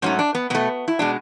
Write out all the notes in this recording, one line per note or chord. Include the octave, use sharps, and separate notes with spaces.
G#2 F#3 A3 C#4
D4
B3
B2 A3 B3
E4
B2 G#3 D4